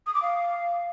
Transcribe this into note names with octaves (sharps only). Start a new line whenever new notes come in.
D#6
D6
F5